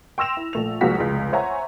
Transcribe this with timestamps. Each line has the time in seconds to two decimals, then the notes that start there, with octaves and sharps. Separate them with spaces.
0.18 G5 C6 E6 A#6 E7 F7
0.37 E4
0.53 A#1 A3 F7
0.81 C2 F3 G#3 A#3 F#4 B6
0.98 F1 C#2 G#3
1.33 C5 C#5 E5 F#5 G#5 A#5